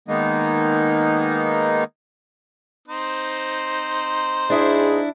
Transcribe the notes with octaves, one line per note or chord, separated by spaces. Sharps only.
D#3 G#3 A#3 B3 D#4
C4 D#4 C5
G#2 D4 E4 G#4